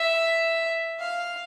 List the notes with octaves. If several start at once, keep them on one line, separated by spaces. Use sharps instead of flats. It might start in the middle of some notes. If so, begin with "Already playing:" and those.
Already playing: E5
F5